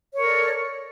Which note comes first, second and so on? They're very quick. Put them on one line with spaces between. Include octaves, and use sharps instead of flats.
C#5 A#4 A4 D5